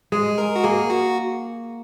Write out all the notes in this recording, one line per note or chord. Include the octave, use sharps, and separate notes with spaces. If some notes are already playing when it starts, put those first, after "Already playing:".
G#3 G#4
A#4
F#4
A#3 G#4
F#4